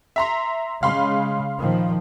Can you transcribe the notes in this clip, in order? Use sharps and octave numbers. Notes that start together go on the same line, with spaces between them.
E5 A#5 C6
C#3 G#3 F5 B5 C6
A#2 D#3 F3